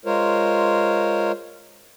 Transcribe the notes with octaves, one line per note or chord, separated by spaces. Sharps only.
G#3 F4 A#4 C5 C#5